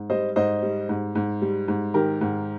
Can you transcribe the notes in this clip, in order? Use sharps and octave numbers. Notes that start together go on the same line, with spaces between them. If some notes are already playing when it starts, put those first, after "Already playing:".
Already playing: G#2
G3 C5 D#5
G#2 C5 D#5
G3
G#2
G#2
G3
G#2
D#3 G4 A#4
G#2